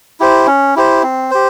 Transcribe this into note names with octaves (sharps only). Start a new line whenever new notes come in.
E4 G4 C5
C#4
E4 G4 C5
C4
G4 C5